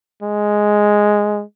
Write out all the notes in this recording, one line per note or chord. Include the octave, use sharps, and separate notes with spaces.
G#3